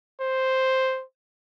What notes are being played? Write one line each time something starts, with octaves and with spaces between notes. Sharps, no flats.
C5